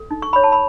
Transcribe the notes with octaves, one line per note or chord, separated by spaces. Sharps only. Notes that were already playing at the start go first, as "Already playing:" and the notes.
Already playing: A4
D#4
C#6
C#5 B5
A5
B5